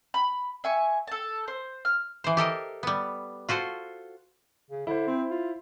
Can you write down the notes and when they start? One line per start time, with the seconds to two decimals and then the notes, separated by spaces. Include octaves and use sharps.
0.14 B5
0.64 E5 G#5 C#6
1.07 A4 A5
1.48 C5
1.85 F6
2.24 E3 C5
2.37 G4 A4 A#4 D#5
2.83 G3 B3
3.49 F4 F#4 A4 C5
4.71 C#3
4.87 D3 E4 C5
5.07 C4
5.31 F4